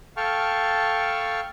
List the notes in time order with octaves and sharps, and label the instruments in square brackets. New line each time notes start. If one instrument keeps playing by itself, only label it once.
[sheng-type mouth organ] A4 F5 G5 A5 C#6 F6